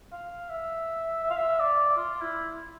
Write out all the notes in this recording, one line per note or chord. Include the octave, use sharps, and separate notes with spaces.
F5
E5
E5
F5
E5
D5
F4
E4